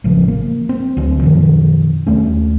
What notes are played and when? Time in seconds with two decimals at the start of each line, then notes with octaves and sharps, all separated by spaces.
0.04 A1 C#3 F3
0.28 A#3
0.69 C4
0.97 D2 F#3 C4
1.22 F#2 B2 D#3 F3
2.07 D#2 A3 C#4